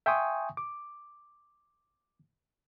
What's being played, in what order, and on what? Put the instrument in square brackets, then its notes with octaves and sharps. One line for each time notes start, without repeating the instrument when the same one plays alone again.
[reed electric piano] E5 G5 G#5 C6 C#6 D#6
D6